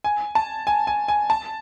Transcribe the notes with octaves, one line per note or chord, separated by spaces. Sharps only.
G#5
A5
G#5
G#5
G#5
A5